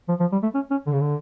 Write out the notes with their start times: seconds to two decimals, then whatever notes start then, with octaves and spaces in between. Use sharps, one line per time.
0.09 F3
0.20 F3
0.32 G3
0.43 A3
0.55 C#4
0.71 C#4
0.87 D3
0.93 C#3
1.01 D3